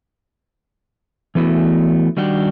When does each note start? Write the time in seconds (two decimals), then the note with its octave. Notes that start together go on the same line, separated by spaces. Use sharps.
1.35 E3 A3 B3 E4 F#4
2.17 D#3 G3 D4 F#4 G4